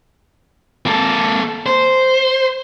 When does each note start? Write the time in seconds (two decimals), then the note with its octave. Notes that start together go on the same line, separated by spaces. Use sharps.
0.86 A#3 A4
1.66 C5